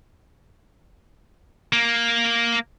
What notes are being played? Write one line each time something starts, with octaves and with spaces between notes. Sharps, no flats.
A#3